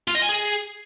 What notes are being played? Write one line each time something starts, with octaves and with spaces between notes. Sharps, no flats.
F4
D#5
G#5
G#4